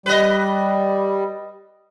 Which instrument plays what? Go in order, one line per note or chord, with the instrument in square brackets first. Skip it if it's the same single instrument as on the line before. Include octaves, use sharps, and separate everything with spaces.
[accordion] G3 [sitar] B4 D#5